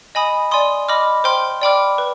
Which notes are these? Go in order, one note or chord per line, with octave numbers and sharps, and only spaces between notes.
D#5 G#5 B5 D#6
D5 G#5 C6 D#6
D#5 B5 D6 F6
C5 G5 C6 F6
D5 G5 B5 D6 F6
B4